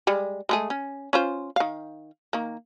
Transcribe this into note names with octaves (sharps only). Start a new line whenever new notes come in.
G3 G#3
G#3 A3 G#4
C#4
C#4 F4 C5
D#3 F5
D#3 A#3